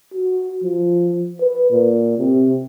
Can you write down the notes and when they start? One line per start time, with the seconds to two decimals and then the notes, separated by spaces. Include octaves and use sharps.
0.14 F#4
0.64 F3
1.40 B4
1.71 A#2
2.18 C3